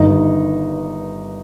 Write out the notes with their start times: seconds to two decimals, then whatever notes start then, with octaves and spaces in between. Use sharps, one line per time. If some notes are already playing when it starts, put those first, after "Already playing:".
Already playing: G1 G2 D#3 D#4